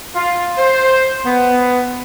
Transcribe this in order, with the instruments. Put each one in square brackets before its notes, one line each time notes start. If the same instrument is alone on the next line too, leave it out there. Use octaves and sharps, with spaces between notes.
[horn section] F4
C5
B3